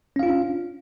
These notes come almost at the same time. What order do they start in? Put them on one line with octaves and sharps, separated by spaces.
C#4 F5 F4 D4